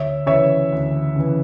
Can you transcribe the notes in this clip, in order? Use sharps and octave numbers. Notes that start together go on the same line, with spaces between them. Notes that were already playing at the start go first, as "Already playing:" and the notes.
Already playing: D2 C#5 E5
C#3 E3 C#5 E5
D2
C#3 E3